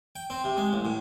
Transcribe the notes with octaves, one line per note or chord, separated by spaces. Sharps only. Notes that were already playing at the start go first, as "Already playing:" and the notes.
G5
C4
C3
G#3
A1
A2